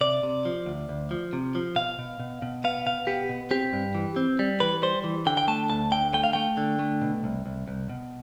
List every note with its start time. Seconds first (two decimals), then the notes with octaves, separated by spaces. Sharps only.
0.01 C3 D5
0.23 C3
0.45 F3
0.66 D2
0.89 D2
1.11 F3
1.33 C3
1.55 F3
1.76 B2 F5
1.99 B2
2.20 B2
2.42 B2
2.64 B3 F5
2.86 B2 F5
3.07 B3 G4
3.29 B2
3.51 C4 G4
3.73 G2
3.95 E3
4.16 C4
4.39 G3
4.60 E3 B4
4.82 G3 C5
5.04 E3
5.26 D3 G5
5.37 G5
5.48 A3 A5
5.70 D2 A5
5.92 D3 G5
6.14 A3 G5
6.24 F5
6.33 A3 G5
6.57 D3
6.79 A3
7.02 B2
7.24 C2
7.46 C2
7.68 C2
7.89 B2